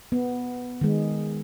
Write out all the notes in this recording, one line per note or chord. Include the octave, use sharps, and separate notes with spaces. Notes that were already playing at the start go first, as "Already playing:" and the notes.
B3
D#3 G#3